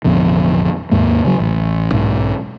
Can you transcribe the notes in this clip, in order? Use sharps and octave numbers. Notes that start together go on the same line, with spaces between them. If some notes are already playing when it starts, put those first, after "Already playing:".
A1 F2 B2 D3
D#2 G#2 A#3
C#3 F#3
A1
B1 G#2